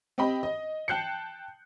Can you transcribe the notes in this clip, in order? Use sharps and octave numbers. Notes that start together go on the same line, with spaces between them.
C4 G4 D#5 G5 B5
D#5
G5 A5 F#6 G6 C7 C#7